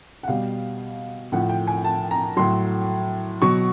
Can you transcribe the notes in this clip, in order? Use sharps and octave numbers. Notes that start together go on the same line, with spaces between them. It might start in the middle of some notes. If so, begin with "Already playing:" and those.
F#5
B2 G3 F5
A2 F3 F#5
G5
G#5
A5
A#5
A2 F#3 C6
B2 F#3 C#6